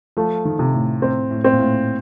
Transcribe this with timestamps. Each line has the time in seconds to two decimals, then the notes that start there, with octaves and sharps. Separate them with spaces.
0.17 F3 A3
0.45 D#3
0.59 C3
0.73 A2
1.02 A2 C4
1.31 A2
1.44 C4
1.52 A#2
1.58 A2